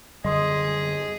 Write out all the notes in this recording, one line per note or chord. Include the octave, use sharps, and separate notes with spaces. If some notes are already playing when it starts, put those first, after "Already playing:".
F#2 D3 G3 G#4 D#5 C6 D#6